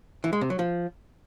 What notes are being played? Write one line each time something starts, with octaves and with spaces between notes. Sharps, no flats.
E3
G#3
C3
F#3
F3